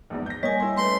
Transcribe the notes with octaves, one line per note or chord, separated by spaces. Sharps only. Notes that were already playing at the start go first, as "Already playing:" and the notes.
A#1 E2 G#2
G6 A#6
G3 A#3 C#5 D#5 G#5
E4 C6
A3 C#4 B4 C6